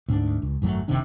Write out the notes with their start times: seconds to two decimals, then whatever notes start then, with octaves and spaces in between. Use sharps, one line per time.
0.09 D2 G#2 G#3 D4
0.42 C#2
0.62 G#1 F#2 F#3 A3
0.88 F#1 C3 D#3 D4